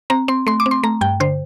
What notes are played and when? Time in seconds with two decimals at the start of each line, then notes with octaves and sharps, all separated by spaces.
0.10 C4 A#5
0.28 C4 C6
0.47 A3 C6
0.60 D6
0.66 C4
0.71 C6
0.83 A3 A#5
1.01 G2 G5
1.20 D3 C5